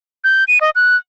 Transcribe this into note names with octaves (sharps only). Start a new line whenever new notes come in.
G6
D#7
D#5
F#6